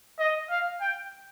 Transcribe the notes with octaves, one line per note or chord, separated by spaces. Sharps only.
D#5
F5
G5